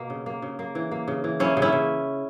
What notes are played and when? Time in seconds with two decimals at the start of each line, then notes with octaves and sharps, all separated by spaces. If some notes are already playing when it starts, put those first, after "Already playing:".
Already playing: B2 A#3
0.10 C#3
0.26 A#3
0.42 C#3
0.59 A#3
0.75 E3
0.91 A#3
1.08 C#3
1.24 E3
1.40 A#3 C#4 E4
1.57 C#3
1.62 C#4 E4
1.73 C#3